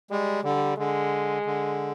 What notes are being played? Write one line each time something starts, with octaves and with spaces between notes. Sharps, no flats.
G3 G#3
D3 G3
D3 G#3
D3